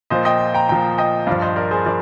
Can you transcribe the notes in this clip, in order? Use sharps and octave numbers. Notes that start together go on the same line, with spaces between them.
A#2 F3 C5 D#5
D#5 G5
G5 A#5
A#2 F3 G5 A#5
D#5 G5
G2 F3 D5 F5
C5 D#5
A#4 D5
G#4 C5
F3 A#4 D5